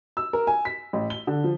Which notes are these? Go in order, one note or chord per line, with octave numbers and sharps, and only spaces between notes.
E6
A#4
G#5
B6
A1
G7
D3
F3